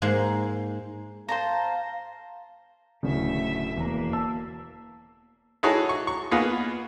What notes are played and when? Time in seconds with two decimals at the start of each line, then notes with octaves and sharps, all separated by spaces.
0.02 G#2 G#3 A#3
1.28 C5 F5 A5 A#5
3.03 D1 C#3 A3 E5
3.77 E1 A#3 A#5
4.13 A5 E6
5.63 D#4 E4 F#4 G#4 A4 C#5
5.89 C#6
6.07 C#6
6.31 A#3 B3 D#4 F4 G#4 B4